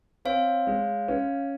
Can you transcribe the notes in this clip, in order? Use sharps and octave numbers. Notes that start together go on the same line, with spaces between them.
C4 C#5 F5
G#3
C#4